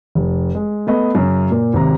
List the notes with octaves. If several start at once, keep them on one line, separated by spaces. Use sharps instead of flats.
F1
G#3
A3 B3 D#5
F#2 C#3
A#2 A#3
G#1 C3 A#5